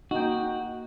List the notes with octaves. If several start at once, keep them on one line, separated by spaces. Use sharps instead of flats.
A#3 D#4 F#4 G5